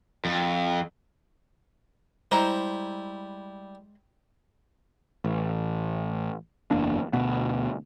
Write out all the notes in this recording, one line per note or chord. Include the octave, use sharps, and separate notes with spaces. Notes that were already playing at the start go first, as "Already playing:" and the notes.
F2
G3 G#3 E4 C5 A#5
A1
F#1 E2 A#3 D4
D2 B2 B3